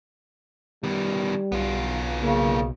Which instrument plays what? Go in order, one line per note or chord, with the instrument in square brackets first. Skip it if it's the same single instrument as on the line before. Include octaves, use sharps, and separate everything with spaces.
[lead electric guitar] D#3 B3 [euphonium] G3
[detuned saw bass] B1 [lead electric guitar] B3 F4
[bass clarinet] C#3 [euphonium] A#3